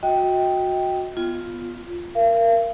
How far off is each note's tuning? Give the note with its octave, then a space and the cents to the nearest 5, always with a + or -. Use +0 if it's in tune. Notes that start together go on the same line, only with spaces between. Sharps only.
F#4 -20 D#5 +35 G5 +0
B3 +0 F4 +0
A#4 +0 F5 -40